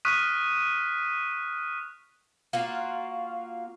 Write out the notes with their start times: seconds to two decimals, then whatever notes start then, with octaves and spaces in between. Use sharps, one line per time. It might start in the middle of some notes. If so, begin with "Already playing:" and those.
0.05 C#6 D#6 F6 F#6 B6 D#7
2.53 A#3 F4 F#4 F5